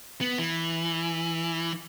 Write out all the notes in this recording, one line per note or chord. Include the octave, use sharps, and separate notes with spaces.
B3
E3